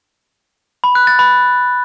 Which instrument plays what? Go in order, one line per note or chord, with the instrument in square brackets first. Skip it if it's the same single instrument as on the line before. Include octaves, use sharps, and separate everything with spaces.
[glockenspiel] B5
F#6
A6
B5